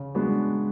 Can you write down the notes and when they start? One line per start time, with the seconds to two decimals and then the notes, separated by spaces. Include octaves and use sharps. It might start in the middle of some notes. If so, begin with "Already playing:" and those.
Already playing: C#3
0.15 G#3 B3 D4 F#4